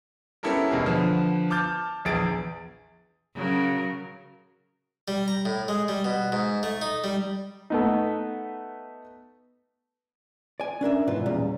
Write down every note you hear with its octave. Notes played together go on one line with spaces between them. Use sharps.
B3 C#4 E4 G4 A4 A#4
E1 B2 G#4 A#4
D3 F3 B3
A5 D6 F6 G6 A6
A#1 E2 G#4 A6 D7
C#3 F#3 A#4
G3
A#5
A2
G#3
G3
B2
G#2
A3
D#4
G3
A3 B3 D#4
D5 G#5
C#4 D4 A#4 E5
G#2 B2 E3 F4
E2 A#2 C#3 G3